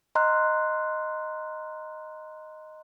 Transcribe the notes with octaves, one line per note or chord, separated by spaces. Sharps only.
D#5 A#5 C6 F6 F#6